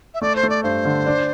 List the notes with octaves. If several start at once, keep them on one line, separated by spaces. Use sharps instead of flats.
E5
A3 D5
C5
A3
D5
G2 C5
D3
D4